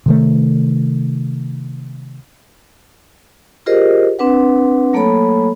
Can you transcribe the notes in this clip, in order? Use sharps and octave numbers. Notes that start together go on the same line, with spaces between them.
C3 D#3 A3
F4 G4 G#4 A#4 C5 D#5
C4 D4 B4 F#5
F#3 A3 A#3 A4 C#5 B5